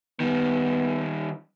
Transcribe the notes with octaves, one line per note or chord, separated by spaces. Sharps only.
D#3 G3 B3